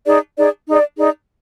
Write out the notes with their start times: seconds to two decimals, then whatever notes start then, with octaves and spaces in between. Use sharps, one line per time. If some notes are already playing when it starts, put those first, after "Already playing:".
0.06 D#4 G#4 D5
0.37 D#4 G#4 D5
0.67 D#4 G#4 D5
0.98 D#4 G#4 D5